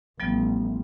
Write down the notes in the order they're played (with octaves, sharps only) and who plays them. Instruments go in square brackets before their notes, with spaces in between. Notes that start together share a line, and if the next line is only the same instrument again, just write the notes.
[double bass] A1 [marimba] F3 G3 B3